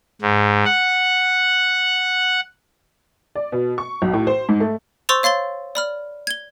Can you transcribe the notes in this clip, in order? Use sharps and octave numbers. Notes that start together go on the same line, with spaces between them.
G#2
F#5
D5
B2
C#6
B1
A2
C5
G#2
A3
C5 C6 C#6 E6 A6 F7
C#5 F5 C6 A6 G7
D5 B5 F6
G#6 G7